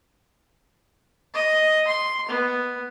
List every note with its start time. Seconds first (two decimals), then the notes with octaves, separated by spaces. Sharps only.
1.34 D#5
1.87 C6
2.28 B3